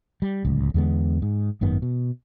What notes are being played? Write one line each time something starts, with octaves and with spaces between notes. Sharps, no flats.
G3
D1 C#2
E2 D3 G#3 B3
G#2
G#1 F#2 D#3 B3
B2